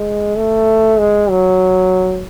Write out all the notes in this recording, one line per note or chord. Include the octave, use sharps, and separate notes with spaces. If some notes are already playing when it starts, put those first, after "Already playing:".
Already playing: G#3
A3
G#3
F#3